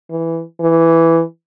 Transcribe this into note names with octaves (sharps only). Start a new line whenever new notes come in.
E3
E3